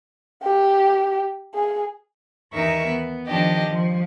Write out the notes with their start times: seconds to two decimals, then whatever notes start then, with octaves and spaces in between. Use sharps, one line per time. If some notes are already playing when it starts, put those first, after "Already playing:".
0.44 G4
1.54 G#4
2.53 D#2 E3 D#4 A#4 E5 C#6
2.88 B3
3.27 D#3 F3 D4 G4 D#5
3.70 F3